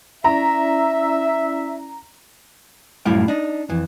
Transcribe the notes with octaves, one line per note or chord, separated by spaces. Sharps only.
C#4 E4 D5 E5 A#5
F#2 A2 G3 E4 F4 G5
D4 D#4
F2 E3